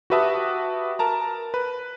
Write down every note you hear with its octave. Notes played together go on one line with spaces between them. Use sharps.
F#4 G4 B4 E5 A5 D#6
A#4 A5 A#5
B4